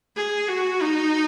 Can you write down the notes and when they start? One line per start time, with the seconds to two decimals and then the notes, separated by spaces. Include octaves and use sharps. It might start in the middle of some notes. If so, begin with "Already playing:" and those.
0.16 G#4
0.48 F#4
0.81 D#4